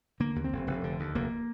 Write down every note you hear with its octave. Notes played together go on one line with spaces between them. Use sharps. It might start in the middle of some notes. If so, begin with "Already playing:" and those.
D3 A#3
D#2
C4
F1
F1
D3
D#2
F1 A#3